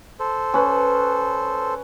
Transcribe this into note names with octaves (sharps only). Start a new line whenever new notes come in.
A4 C5
C#4 B4